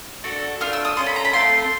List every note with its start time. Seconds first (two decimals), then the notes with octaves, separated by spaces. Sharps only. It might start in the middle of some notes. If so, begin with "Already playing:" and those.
0.24 D4 F#4 A4
0.60 A3 D4 F4 F6
0.73 E6
0.85 D#6
0.97 C#4 F4 A4 C6
1.06 B5
1.16 A#5
1.25 B5
1.33 A3 C4 F4 A4 C6